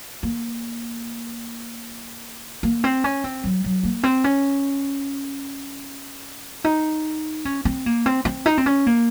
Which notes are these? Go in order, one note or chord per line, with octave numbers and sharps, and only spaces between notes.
A#3
A#3
C4
C#4
C4
F#3
F#3
A#3
C4
C#4
D#4
C#4
C4
A#3
C4
C4
D#4
C4
C#4
A#3